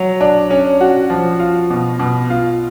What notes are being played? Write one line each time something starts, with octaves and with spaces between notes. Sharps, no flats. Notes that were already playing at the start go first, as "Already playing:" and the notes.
Already playing: F#3
D4
C#4
F#4
F3
F4
B2
B2
F4